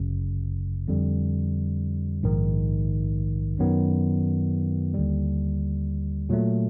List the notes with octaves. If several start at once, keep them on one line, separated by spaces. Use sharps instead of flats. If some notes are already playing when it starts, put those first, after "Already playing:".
Already playing: G1 F#2 C#3
F2 D3 G3
A#1 G#2 D#3
F#2 D#3 F#3 B3
D#2 D3 G3
A#2 F#3 A3